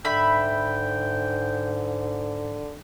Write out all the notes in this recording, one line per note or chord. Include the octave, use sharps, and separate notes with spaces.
G#2 D3 E5 G5 B5